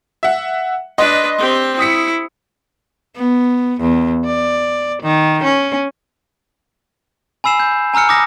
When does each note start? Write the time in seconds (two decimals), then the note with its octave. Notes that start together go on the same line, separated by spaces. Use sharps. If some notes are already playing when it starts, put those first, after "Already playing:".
0.23 E5 F#5
0.98 D4 B4 D#5 C6
1.39 C4 G4
1.79 E4 D#6 B6 C#7
3.16 B3
3.81 E2
4.26 D5
5.03 D#3
5.44 C#4
7.44 G#5 B5 E6 C7 E7
7.60 G6
7.94 G#5 A#5 E6 F6 C#7
8.09 D6 D#6 A#6